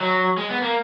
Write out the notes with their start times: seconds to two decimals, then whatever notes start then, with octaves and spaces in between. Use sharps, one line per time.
0.01 F#3
0.37 G#3
0.50 B3
0.62 A#3